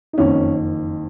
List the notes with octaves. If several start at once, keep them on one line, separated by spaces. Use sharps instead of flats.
D#4
F#1 F2 D#3 C#4